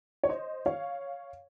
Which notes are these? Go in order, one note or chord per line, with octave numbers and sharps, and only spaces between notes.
C#5
C5 D#5
C#5 F5